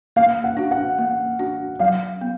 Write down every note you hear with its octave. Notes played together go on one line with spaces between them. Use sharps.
A#3 F5
F#5
D4 F#4
F#5
A#3
D4 F#4
F#3 F5
B3